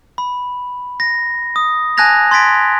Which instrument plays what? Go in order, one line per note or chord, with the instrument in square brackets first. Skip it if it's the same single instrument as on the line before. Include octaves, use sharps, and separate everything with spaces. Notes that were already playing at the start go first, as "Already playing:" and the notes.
[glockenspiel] B5
A#6
D#6
G#5 A5 F#6 G#6 A#6 F7
C6 G#6 A6 B6 D7